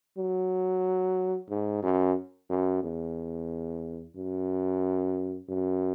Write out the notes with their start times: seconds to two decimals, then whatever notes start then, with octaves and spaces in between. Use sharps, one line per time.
0.17 F#3
1.50 G#2
1.83 F#2
2.49 F#2
2.83 E2
4.16 F#2
5.49 F#2